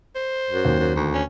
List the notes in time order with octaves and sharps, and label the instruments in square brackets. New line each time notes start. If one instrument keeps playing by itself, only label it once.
[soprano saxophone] C5
[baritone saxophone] F#2
[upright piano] D#2
[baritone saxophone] F#2
D2
[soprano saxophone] C#4